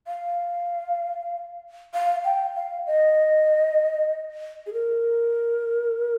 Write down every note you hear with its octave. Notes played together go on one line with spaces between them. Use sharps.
F5
F5
G5
F5
D#5
G#4
A#4